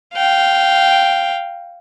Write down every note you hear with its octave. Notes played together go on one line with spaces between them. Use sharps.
F5 G5